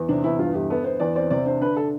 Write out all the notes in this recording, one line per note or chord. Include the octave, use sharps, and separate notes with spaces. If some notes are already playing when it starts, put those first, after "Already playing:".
Already playing: E2
C3 D4
E2 E4
G2 F4
G1 G4
B3 A4
B3 C5
E2 D5
C4 D5
C3 D5
D4 C5
D3 B4
A4